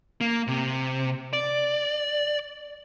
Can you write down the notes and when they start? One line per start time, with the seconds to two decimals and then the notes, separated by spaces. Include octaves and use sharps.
0.21 A#3
0.47 C3
1.33 D5